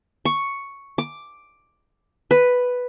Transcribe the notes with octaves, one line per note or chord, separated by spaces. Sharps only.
C#6
D6
B4